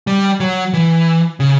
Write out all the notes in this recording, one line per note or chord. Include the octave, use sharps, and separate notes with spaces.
G3
F#3
E3
C#3